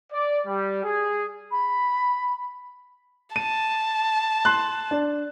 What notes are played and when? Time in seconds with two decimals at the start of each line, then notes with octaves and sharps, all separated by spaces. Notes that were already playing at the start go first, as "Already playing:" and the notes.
0.11 D5
0.46 G3
0.84 G#4
1.51 B5
3.36 A5 D#7
4.45 C6 F#6
4.91 D4